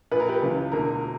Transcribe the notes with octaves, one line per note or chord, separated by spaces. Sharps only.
A#1 A#2 A#4 B4
G4 B4
C#2 C#3 E3
E1 D2 D3 A#4